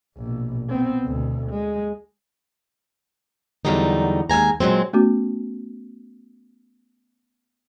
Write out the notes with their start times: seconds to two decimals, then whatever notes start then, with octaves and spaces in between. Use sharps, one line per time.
0.17 A#1 B2
0.69 B3 C4
1.05 D2 B2
1.50 G#3
3.65 E2 A#2 D3 F#3 G3 D#4
4.30 D#2 G#3 G#5 A#5
4.60 A#2 F#3 G#3 C4
4.93 A3 B3 C#4 F#4